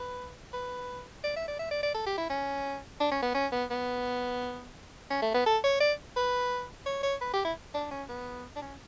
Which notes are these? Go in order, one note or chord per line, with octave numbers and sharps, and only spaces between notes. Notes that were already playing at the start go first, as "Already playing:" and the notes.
Already playing: B4
B4
D5
E5
D5
E5
D5
D5
A4
G4
E4
C#4
D4
C#4
B3
C#4
B3
B3
C#4
A3
B3
A4
C#5
D5
B4
C#5
C#5
B4
G4
E4
D4
C#4
B3
D4
C#4